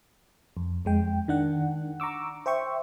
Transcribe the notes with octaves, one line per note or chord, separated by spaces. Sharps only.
F2
F2 G#3 G5
D#3 D4 F#5
A#5 C#6 D6 E6
C5 E5 G5 C#6